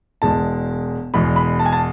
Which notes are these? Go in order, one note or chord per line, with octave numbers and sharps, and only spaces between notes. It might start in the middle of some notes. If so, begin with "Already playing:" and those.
E1 E2 B2 G#3 A5
E1 E2 B2 G#3 B5
B5
A5
G#5
A5